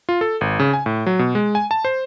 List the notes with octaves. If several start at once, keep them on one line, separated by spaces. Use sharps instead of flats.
F4
A4
G#1
C#3
G#5
A2
F#3
B2
G#3
G#5
A5
C5